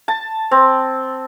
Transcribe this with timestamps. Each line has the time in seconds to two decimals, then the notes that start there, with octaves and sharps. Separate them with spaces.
0.08 A5
0.51 C4